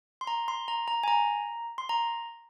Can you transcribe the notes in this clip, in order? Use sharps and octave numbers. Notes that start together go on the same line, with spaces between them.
C6
A#5
C6
A#5
A#5
G#5
A#5
C6
A#5